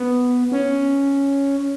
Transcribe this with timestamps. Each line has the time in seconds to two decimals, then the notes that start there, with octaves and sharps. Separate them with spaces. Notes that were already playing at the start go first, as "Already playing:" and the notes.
Already playing: B3
0.52 C#4